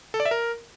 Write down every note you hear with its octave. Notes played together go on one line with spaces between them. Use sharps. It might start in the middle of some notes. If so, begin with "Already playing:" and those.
A4
D5
E5
A#4